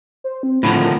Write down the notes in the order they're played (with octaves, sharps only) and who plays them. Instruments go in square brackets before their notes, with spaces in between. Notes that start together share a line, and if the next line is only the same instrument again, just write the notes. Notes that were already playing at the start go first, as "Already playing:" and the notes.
[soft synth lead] C5
C4
[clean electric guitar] A2 D3 F3 [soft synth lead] B5
[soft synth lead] A#4